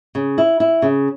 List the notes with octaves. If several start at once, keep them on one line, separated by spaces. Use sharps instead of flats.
C#3
E4
E4
C#3